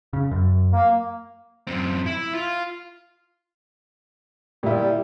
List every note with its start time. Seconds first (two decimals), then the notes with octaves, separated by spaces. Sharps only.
0.13 C#3
0.31 F#2
0.73 A#3
1.67 F#2 C4
2.06 E4
2.35 F4
4.63 A#2 G3 E4